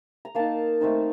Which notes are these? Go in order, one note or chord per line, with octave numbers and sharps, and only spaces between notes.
A#5
A#3 D#4 F5 A5
A3 C4 D#4